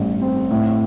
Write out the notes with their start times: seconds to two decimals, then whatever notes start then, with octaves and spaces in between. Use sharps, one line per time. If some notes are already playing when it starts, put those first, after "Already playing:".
Already playing: A1 G2
0.21 C4
0.51 A2